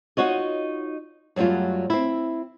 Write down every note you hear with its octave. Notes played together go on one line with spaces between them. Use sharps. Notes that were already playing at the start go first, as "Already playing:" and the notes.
D#4 F4 F#4 C#5 D#5
F#2 F#3 G3 A3 F4
C4 E4